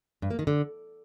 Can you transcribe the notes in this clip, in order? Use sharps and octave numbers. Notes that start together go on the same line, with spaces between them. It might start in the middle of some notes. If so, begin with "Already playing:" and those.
G2
A#3
D#3
D3